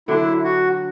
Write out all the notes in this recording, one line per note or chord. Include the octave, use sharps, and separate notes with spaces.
D3 F#3 D4 E4
F#4